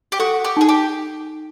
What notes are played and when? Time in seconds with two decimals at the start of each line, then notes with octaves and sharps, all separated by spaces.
0.12 G4
0.19 F#4 A4
0.44 G4
0.57 D#4 G#4
0.69 G4